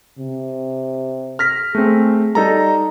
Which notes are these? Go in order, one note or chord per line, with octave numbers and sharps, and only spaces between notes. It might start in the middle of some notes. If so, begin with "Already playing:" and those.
C3
F6 A#6 B6
A3 C4 G#4
G3 D#4 A4 A#5